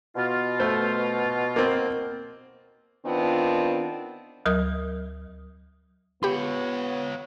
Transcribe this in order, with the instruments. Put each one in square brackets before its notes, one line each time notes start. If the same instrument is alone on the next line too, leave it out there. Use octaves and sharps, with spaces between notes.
[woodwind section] B2 F4
[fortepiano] A3 C5
A#3 C4
[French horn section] D#3 B3 C4 D4 F4
[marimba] D2 F#3 A#4 D#6
[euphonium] B3 [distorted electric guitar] F4 C#5 [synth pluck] G4 B5